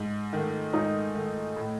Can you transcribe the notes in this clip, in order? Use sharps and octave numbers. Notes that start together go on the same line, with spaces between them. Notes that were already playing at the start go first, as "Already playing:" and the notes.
Already playing: G#2
D#3 A3
G#2 D#4
D#3 A3
A2